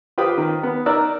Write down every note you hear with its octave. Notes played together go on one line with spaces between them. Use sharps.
F4 G4 B4 C5 G5 D#6
D#3
B3
D#4 A#4 D5 E6 F#6